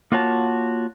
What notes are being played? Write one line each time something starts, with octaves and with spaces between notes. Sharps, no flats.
A#3 F4 F#4 C#5 A5